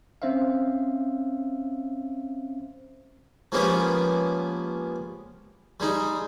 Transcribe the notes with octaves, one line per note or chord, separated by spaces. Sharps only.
C4 C#4 C5 E5 F5
F3 G#3 A#3 B3 C#4 G4
G3 G#3 D#4